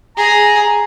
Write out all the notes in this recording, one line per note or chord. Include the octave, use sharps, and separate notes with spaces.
G#4 A#5